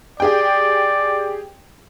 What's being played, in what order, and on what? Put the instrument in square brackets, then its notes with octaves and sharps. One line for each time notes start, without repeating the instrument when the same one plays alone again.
[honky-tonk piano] G4 G#4 G5 [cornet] D5